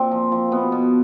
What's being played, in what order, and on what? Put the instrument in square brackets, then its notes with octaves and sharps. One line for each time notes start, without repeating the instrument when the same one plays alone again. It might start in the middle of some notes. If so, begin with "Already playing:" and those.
Already playing: [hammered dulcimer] A#2 C4
F3
F3
B2 B3
B2